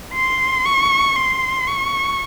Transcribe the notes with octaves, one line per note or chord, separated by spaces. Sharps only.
C6
C#6
C6
C#6